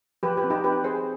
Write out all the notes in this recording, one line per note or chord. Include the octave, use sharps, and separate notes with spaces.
F3 G4 B4
G4 B4
C4
D#4 G4
C4 G4 B4
C4 G#4 C5